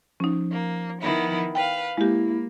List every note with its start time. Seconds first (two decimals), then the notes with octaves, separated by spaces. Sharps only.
0.20 F3 C#4 D#4
0.51 A#3
1.00 D#3 B3 E4
1.55 B4 F5 G5
1.97 G#3 A#3 E4 G4